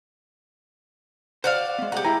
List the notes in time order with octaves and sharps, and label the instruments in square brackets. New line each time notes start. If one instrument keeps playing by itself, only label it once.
[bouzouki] F#4 D5 F5 [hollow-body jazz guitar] C5
[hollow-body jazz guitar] G#3 B3
[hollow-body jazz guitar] G3 G#4 A#5 [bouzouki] G4 F#5
[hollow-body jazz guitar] G#3 G#5 [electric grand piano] E4 G5 A#5